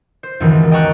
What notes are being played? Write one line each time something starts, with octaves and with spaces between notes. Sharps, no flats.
C5
C#2 F#2 D#3 E3
D#5 G5 A5 A#5 C#6 F#6